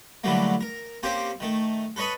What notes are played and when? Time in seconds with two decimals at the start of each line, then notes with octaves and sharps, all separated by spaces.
0.24 D3 E3 F#3 G3 A3 A#3
0.61 A#4
1.03 A#3 C4 C#4 G4 C5
1.40 D#3 A3
1.96 A4 B4 C#5 D#5 B5